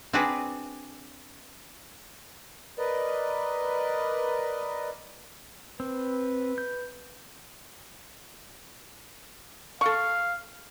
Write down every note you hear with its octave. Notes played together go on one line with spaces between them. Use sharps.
C4 D4 F#4 G#4 B4 D5
A#4 B4 D5 D#5
C4 B4
G6
A4 F5 C#6